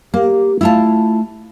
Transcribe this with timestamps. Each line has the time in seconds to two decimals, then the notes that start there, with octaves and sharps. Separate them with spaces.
0.14 A#3 G4
0.61 A3 E4 F4 A5